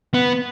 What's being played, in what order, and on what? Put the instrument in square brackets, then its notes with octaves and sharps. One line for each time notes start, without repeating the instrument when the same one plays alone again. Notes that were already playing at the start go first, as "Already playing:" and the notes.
[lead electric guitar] B3